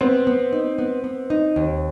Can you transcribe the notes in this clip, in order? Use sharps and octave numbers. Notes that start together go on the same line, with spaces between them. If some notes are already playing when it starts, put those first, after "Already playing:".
B3 C4
B3
D#4
B3
B3
D#4
D#2